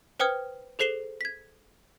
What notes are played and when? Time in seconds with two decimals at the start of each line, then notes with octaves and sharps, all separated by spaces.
0.20 B4 C5 G5 D#6 F6 G#6
0.79 G#4 A4 C5 C7 E7 G7
1.21 G#6 B6